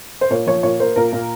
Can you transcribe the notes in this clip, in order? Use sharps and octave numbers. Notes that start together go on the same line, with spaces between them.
C5
A#2 C#5
F3 C#5
A#2 C#5
A#3 C5
A#2 A#4
A#2